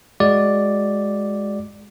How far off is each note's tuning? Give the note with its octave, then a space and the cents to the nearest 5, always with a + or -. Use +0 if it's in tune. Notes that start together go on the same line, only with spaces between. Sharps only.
G#3 +0 F#4 +0 D5 +0